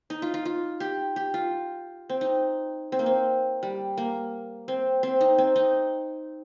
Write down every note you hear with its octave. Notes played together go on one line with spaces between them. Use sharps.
D#4
F4
F4
F4
G4
G4
F4
C4
D#4
C4
A#3
C4
G3
A#3
C4
C4
D#4
C4
D#4